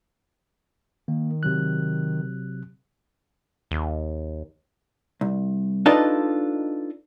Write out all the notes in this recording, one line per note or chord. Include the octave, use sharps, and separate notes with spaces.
D#3 A#3
C3 F#3 F#6
D#2
C2
D4 D#4 F4 A4 B4 D#5